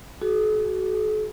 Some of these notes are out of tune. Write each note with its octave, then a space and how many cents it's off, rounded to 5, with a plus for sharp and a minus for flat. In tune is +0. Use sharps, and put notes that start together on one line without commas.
F#4 +20 A4 -45